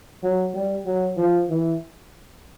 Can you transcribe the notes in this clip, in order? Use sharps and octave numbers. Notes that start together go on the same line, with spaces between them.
F#3
G3
F#3
F3
E3